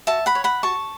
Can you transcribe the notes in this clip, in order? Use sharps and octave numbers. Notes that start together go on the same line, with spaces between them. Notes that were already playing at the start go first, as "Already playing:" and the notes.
F#4 E5 A5
F#5 B5
C#5
F#5 B5
F#4 A5 C#6